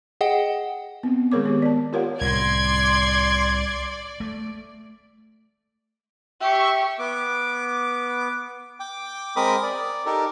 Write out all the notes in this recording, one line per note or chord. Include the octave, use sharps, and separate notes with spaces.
G#4 D#5 F#5 G5
B3 C4
D#3 G#3 G#4 A#4 C#5 D6
B3 G4
D5 A5
F4 G4 A#4 C#5 F5 F#5
C2 A2 D5 C6 G#6
A3
G4 E5 C#6
B3 D6
G5 D6
G#3 C4 A#4 B5 D6 D#6
D5
D#4 G4 A4 A#4